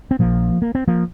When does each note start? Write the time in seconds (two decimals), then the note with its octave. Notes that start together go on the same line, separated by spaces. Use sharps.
0.11 C4
0.19 A#1 A#2 F3 A#3
0.62 A#3
0.75 C4
0.87 F3 A#3